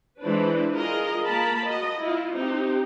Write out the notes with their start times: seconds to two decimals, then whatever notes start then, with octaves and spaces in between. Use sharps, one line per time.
0.23 E3 G#3 D4 B4 C5
0.72 F4 G#4 A#4 D#5
1.26 A#3 A#4 A5 B5
1.66 F#4 D#5
2.00 E4 F4
2.34 C4 D#4 G4